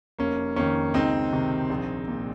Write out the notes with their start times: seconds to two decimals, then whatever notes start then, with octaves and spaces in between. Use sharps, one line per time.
0.19 F1 A#3 C#4
0.56 F2 D#3 A#3 C#4
0.94 C#2 C4 D#4
1.32 C3 D#3
1.70 A#1
2.08 A#2